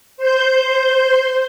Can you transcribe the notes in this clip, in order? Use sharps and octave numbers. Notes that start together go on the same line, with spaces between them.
C5 G6